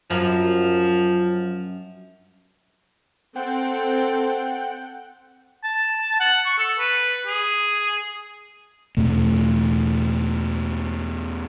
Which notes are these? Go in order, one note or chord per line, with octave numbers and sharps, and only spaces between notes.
F#2 F3
C4 A4 F#5 G5
A5
F#5
C#6
A4
B4
G#4
E2 B2 A3